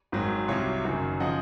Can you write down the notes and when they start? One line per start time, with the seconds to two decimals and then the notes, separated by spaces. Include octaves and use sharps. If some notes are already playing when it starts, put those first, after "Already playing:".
0.12 G#1 G#2 D#3 F#3
0.48 C2 C3 F#3 C#5 F5
0.85 F#1 F#2 D#3 F#3
1.20 C#3 F3 D#5 F#5